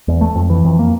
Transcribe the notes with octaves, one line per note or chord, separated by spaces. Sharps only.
E2
A3
F2
E3
F2
A#3